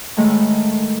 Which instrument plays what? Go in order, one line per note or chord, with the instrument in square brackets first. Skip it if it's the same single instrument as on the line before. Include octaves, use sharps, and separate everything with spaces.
[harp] A2 D#3 G#3 A3